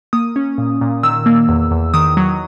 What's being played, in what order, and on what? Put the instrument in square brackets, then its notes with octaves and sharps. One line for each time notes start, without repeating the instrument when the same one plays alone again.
[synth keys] A#3 D#6
C#4
A#2
A#2
D#3 E6
A#3
E2
E2
D#3 D#6
F#3